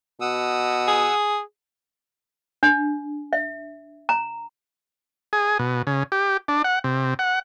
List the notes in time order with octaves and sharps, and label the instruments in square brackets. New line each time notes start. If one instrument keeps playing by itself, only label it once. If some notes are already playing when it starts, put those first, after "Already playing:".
[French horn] B2 [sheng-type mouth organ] F#5 D#6 E6
[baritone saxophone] G#4
[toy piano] D4
E5
A#5
[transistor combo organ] G#4
B2
C#3
G4
D4
F#5
C3
F#5